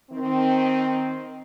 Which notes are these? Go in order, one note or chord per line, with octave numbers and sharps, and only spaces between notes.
D#3 C4